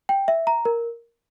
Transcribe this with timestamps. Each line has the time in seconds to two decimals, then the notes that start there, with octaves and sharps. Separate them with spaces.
0.09 G5
0.28 E5
0.47 A#5
0.65 A#4